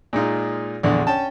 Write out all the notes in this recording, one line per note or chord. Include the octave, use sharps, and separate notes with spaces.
A#2 G#3 D#4 F4
A#1 E2 D3
C#4 G5 A5